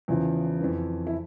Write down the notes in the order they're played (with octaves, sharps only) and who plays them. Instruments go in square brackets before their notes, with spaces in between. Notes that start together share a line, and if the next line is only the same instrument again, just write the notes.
[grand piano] E2 C#3 F3 E4
F2 E3
E4